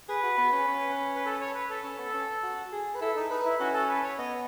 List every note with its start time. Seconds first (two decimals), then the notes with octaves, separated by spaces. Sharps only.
0.08 G#4 B4
0.23 F#4
0.38 B3
0.52 C#4
0.67 C#4
1.16 B4
1.26 A4
1.41 C#5
1.55 B4
1.70 A4
1.84 C#4
1.98 B3
2.14 C#4
2.43 F#4
2.72 G#4
2.95 B4
3.01 E4 A4
3.16 D#4
3.30 D#4 B4
3.45 E4
3.60 C#4 F#4
3.74 A4
3.89 B4
4.03 C#5
4.18 B3 D#5